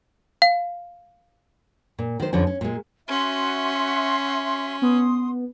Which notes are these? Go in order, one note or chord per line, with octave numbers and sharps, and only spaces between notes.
F5
A#2
D#3 C5
F2 D3 F3 C#4
C#4
A#2 G#3
C#4 F#4 E5 C6
B3 C6 D#6